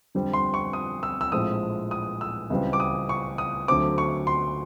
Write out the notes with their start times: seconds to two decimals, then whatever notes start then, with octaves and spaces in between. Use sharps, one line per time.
0.15 F2 D3 G3 C4
0.33 C6
0.54 C#6
0.73 D#6
1.03 E6
1.21 E6
1.32 A#1 A2 F3 G#3 C4 D#6
1.91 D#6
2.21 E6
2.50 C#2 C#3 E3 G3 C4
2.73 D6
2.80 D#6
3.09 C#6
3.38 D#6
3.68 D2 D3 F#3 A3 C4 D6
3.98 C#6
4.27 C6